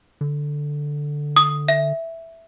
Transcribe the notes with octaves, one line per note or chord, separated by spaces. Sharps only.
D3
D#6
E5